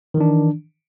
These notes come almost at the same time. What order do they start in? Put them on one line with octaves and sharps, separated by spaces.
D#3 E3 D4